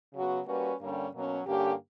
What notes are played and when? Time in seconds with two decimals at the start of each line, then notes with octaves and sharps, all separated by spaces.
0.14 C#3 F#3 B3 F#4
0.46 G3 A#3 C#4 F#4 B4
0.79 G2 D3 G3 A#3 C#4
1.13 B2 F#3 A#3 C#4
1.47 G2 D3 A#3 C#4 G4